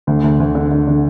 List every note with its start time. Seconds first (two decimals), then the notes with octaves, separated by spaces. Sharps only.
0.07 D2
0.24 D2
0.40 D2
0.55 D3
0.71 D3
0.87 D3